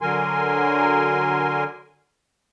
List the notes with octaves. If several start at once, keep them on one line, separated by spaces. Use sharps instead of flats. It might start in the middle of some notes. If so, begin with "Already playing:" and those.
D3 F#3 A#4 G#5 C6